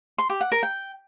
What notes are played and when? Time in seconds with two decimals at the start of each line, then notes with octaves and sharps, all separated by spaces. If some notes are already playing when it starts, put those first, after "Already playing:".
0.18 C6
0.30 G4
0.41 F#5
0.52 A#4
0.63 G5